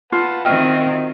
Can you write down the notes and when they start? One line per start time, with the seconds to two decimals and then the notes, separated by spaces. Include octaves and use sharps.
0.12 F4 B4 F#5 A5
0.45 D#3 C4 F#4 D#5 E5 G5 F6